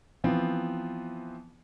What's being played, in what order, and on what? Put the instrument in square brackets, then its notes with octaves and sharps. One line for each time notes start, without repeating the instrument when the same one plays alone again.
[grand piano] E3 F3 B3 C4